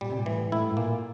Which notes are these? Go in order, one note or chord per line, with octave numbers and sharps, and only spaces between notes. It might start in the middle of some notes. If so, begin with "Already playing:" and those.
A#2 G3
C3
A#2
A2 E3
A2 E4
A2
A#2 A#3